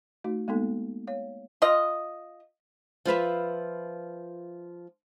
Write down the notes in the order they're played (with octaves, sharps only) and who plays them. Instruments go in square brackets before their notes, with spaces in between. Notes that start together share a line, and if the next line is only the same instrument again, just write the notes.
[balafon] A3 D#4 F#4
G#3 A#3 B3 D#4 A4
C#5 F5
[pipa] F4 D#5
[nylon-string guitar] F3 F4 B4 E5